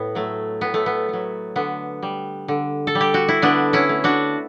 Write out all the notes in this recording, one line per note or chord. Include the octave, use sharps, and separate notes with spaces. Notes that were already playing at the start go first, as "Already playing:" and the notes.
Already playing: A2 B3
F#3 A3
A2 B3
A3
B3
F#3 A3
D3 B3
G3
D3
A4
G3
G4
F#4
E4
D3 B3 D4
C#4 E4
A3
D4 F#4